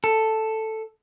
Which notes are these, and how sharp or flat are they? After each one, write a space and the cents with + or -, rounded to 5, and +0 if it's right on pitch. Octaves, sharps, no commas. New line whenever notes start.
A4 +5